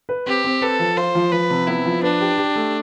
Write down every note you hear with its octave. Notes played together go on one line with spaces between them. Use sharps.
B4
C4 G4
C4
A4 B4
F3
F4 C5
F3
F3 B4
C3
B3 E4
F3
D4 B4
G4
G4
A3